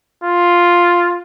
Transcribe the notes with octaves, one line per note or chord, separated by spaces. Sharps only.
F4